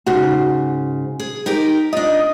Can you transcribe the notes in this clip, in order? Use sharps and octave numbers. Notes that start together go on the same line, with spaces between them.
G#2 C#3 F#4
G#4
D#4 G4 A#4
D4 F4 D#5